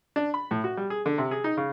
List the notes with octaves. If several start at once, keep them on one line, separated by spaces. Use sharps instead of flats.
D4
B5
A2
F#4
G3
G#4
D3
C3
G#4
D#4
C#3